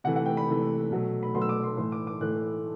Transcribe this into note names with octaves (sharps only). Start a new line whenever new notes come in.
C3 E3 A3 F#5
F#5
G5
B5
C3 E3 A3
B2 F#3 A3
B5
B2 F#3 A3 C6
E6
D6
C6
A2 E3 A3 C6
D6
D6
A2 E3 A3 F#6